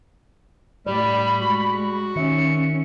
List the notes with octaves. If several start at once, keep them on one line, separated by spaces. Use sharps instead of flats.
A2 G3 G4 D5 B5
G#3 F#4
D#3 C#4 E5 C#7